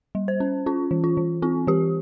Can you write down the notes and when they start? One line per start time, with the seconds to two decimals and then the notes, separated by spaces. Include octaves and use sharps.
0.15 G3
0.28 C5
0.40 C#4
0.66 C#4 F4
0.91 E3
1.04 F4
1.17 E3
1.42 C4 F4
1.67 E3 G4